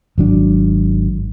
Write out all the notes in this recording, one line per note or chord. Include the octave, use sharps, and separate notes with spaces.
G#1 F#3 D4